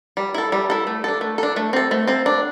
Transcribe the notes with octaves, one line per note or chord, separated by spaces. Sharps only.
G3
E4 A4
G3
E4 A4
A3
D4 A4
A3
D4 A4
A3
C4 A4
A3
C4 A4
D4